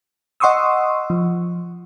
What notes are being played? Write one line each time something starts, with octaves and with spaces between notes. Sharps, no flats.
D#5 F#5 C6 C#6 D#6 E6
F3